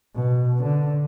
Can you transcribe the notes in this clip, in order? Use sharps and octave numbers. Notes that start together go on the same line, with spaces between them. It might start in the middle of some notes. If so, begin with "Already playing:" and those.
B2
D3